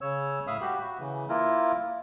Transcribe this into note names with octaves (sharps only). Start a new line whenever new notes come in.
C#3 C#5 E6
A2 E5 F5 B5 D#6
F#4 G4 B5
F#4
C#3 E3
A#3 E4 F4 A#4